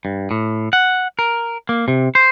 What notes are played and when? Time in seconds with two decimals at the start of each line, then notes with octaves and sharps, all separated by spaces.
0.05 G2
0.31 A2
0.73 F#5
1.19 A#4
1.69 A#3
1.88 C3
2.15 C5